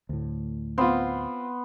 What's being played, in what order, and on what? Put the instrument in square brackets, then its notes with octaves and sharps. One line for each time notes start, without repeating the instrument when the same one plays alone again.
[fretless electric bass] D2 A2
[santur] B3 C6 [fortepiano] C4 F4